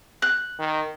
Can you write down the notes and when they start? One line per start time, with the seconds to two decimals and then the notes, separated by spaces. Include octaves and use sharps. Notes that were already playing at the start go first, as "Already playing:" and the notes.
0.22 F#6
0.59 D#3